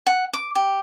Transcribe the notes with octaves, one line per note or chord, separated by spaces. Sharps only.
F#5
D6
G4